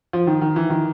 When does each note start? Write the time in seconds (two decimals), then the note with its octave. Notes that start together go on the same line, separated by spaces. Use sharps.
0.13 F3
0.27 D#3
0.41 D#3
0.56 E3
0.70 D#3